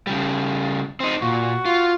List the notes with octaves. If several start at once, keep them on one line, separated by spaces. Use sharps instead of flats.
C#3 G3
C4 D#4
A#2 F#4
F4